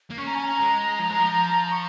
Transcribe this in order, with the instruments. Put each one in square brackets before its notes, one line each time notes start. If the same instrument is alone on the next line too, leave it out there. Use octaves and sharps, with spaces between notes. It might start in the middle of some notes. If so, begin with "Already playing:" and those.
[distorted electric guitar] A#3
[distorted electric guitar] C#4 [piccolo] C#6
[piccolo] A#5
G#5
A#5
[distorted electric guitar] G#3
F3
G#3
F3
[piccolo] C#6